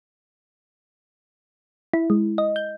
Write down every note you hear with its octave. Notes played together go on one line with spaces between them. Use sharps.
E4
G#3
D#5
G6